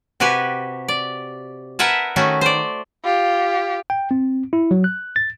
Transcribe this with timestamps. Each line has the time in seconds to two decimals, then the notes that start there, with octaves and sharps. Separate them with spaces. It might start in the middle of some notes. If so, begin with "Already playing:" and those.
0.20 C3 F#4 G4 B4 G#5
0.88 D5
1.79 A#4 B4 E5 F#5 G#5 A5
2.16 D#3 A3 C#4 D#4 F#4
2.41 C5 D5
3.04 F4 G4
3.90 G5
4.11 C4
4.53 E4
4.71 F#3
4.84 F#6
5.16 A6